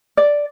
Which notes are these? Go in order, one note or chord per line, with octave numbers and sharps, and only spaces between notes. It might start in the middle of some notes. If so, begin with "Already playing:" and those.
D5